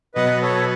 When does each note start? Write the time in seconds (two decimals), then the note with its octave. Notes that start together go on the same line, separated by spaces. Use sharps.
0.15 B2 F#3 B3 B4 D#5
0.42 A4 C#5